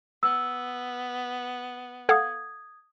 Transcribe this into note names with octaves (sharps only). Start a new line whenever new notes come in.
B3 E6
A4 F5 F#5 D#6 G#6